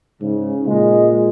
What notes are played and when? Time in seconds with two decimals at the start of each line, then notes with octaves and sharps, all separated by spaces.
0.21 G#2 C#3
0.67 A#2 G#3